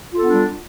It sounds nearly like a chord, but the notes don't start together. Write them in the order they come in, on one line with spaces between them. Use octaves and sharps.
F4 A4 B3 D4 G3